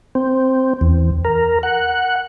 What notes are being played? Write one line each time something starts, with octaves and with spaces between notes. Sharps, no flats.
C4
E2
A#4
F#5